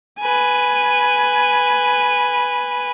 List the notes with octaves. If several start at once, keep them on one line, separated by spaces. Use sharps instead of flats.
B4 G#5